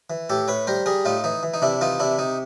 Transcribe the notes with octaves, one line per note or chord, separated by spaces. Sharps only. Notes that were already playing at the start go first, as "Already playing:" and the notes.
E3
A2 G4 A4
A2 B4 C#5
G3 A#4 C5
G3 G#4 A#4
A2 D#4 F4
E3 D#4
E3
D#4
C3 D4 E4
E3 D#4 F4
C3 D4 E4
C3 D#4